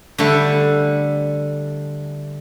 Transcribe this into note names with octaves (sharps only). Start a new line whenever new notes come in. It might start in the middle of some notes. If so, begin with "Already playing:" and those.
D3 G3 A3